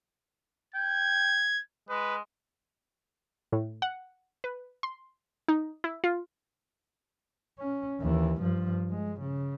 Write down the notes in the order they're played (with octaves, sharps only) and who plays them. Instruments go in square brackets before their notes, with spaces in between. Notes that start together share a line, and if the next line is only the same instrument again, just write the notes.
[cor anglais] G5 [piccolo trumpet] G#6
[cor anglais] G#3 [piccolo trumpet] B4
[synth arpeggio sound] A2
F#5
B4
C6
D#4
E4
F4
[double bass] C#4
D#2 E3
G2 F3
G#3
C#3